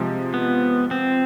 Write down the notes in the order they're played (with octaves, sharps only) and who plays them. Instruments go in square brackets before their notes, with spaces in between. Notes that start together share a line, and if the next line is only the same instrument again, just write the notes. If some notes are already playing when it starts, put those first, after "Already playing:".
Already playing: [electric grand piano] C3 F3 G#3
[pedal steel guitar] B3
C4